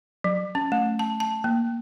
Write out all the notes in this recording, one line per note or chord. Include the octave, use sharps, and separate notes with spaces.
F#3
C#4
A3
A5
A5
A#3